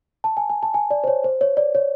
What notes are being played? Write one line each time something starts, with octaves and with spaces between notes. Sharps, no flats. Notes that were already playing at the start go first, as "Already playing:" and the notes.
A5
G#5
G#5
A5
G#5
D5
C5
C#5
C5
C#5
D5
C#5